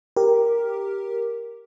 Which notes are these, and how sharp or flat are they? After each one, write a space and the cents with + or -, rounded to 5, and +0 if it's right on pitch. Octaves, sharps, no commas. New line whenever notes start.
G4 +0 A#4 +5